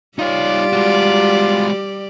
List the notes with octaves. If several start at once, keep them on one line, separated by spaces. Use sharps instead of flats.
G3 D#4 F4 G4 C#5 D5
G#3 F#4